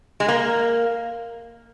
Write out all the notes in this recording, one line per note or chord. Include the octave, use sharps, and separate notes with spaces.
G#3
A#3